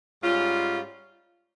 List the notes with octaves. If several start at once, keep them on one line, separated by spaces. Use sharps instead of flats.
G#2 G3 C#4 F4